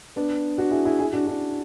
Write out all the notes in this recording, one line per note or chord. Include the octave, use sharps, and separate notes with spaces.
B3 D4
D4 F#4
E4 G#4
E4 G#4
E4 G#4
D4 F#4
D4 F#4